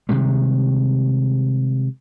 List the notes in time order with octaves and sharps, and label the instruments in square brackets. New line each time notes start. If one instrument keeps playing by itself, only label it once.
[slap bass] C3 D#3 G3 G#3